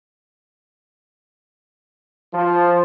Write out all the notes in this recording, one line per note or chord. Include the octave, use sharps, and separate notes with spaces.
F3